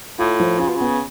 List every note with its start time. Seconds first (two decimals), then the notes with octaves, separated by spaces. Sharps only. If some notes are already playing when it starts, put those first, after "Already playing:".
0.19 A2 F4
0.40 F3
0.59 C#3 F4
0.69 B2
0.76 C#3 B3